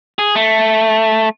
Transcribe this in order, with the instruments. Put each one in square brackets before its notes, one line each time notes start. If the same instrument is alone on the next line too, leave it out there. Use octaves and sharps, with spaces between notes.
[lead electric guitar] G#4
A3